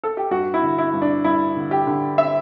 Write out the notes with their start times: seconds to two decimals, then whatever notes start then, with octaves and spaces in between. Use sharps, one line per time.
0.04 A4
0.17 G4
0.31 G2 F#4
0.54 E4
0.62 D3
0.78 E4
0.93 G2
1.02 D4
1.24 G2 E4
1.56 D3
1.71 G4
1.87 D3
2.18 E5